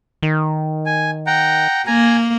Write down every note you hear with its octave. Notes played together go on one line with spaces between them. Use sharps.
D#3
G#5
F#5 G5 A#5
A#3 G#5 A#5